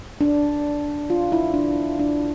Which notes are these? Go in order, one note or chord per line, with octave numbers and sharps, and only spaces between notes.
D4
F4
E4
D4
D4